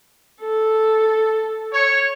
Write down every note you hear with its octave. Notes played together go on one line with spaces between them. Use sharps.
A4
C#5